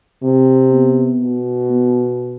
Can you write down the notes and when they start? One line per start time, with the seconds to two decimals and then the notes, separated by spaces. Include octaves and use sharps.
0.23 C3 C4
0.72 B3
1.20 B2
1.69 B3